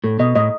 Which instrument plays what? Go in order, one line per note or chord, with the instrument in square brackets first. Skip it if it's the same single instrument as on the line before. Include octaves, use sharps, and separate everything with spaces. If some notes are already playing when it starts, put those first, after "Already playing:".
[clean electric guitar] A2 [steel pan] A4
[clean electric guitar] B2 [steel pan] D#5
[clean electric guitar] A2 [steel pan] D#5